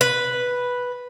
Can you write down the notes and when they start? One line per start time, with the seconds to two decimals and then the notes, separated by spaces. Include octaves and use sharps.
0.01 B4